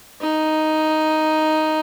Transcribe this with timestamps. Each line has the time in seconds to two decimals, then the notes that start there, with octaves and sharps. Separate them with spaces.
0.21 D#4